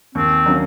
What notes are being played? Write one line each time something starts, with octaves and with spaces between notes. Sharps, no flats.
D#2 C4
D3 F#3 A#3 C#4